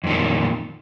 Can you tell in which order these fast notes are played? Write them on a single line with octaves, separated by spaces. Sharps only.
F2 D#3 A#2